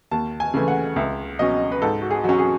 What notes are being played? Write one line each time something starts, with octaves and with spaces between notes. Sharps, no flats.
D#2 A5
G#5
C#3 E3 A3
F#5
C#2 E5
B2 F#3 C#4 D#5
B4
G#2 A4
F#4
G#4
F#3 C#4 F#4
G#4